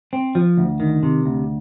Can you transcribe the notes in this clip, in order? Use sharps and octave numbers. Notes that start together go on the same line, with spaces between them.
C4
F3
D2
D#3
C3
D2